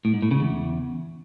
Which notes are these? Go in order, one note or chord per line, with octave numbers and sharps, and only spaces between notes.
A2
G#2
A2
C#3
E2